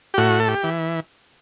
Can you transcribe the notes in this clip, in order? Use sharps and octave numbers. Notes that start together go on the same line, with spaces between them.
G4
A2 F#4
A4
G4
E3